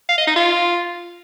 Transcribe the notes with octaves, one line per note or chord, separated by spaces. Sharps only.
F5
D#5
D#4
F4